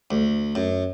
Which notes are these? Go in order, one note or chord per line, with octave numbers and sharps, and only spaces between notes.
D2
F#2